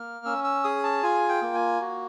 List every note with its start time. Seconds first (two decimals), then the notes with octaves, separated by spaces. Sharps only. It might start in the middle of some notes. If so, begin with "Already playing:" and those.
Already playing: A#3 F6
0.25 C#4 E6
0.44 E6
0.64 G#4 D#6
0.83 A5
1.03 F4 G#5
1.29 G5
1.42 A#3
1.54 G#5
1.81 F#4